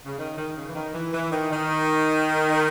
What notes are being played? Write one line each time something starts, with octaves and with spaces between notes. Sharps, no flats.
C#3
D#3
D#3
C#3
E3
D#3
E3
E3
D#3
D#3